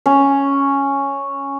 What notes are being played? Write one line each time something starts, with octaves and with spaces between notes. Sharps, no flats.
C#4